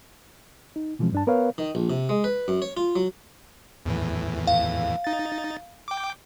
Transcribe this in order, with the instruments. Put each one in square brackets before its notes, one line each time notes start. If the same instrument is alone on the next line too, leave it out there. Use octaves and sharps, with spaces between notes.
[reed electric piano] D#4
B2 E3 F3 G#3 C4
G2 D4 A5
B3 A#4 B4 C#5 F5
[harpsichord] D#3
A#1
C3
G#3
B4
F#2
C#5
F4
F#3
[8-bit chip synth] E2 A2 E3
[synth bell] F5
[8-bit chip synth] D#4 A6
G5 D6